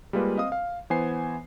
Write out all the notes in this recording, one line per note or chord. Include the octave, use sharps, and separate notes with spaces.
G3 G#3 A#3 F4 B4
C4 D#5 F5 D#6
F5
E3 B3 C5 G#5 C7